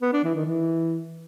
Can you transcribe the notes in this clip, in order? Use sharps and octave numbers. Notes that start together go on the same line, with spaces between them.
B3
D4
E3
D#3
E3